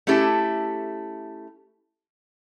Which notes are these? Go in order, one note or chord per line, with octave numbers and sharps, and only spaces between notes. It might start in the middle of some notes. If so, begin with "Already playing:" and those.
A3 C#4 E4 G4 A4